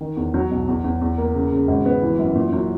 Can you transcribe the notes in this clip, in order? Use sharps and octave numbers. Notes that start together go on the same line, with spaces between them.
D#3
E2
F#3
B1
E2
E2
E2
A#3
C#3
C#3
G#1
B3
E3
F#2
A#2
F#3